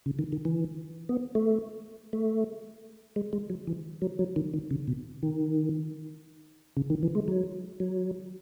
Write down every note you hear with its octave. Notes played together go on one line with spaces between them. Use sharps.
C#3
D#3
D#3
E3
B3
A3
A3
G#3
G#3
F#3
E3
F#3
F#3
D#3
D#3
C#3
B2
D#3
C#3
D#3
E3
G#3
F#3
F#3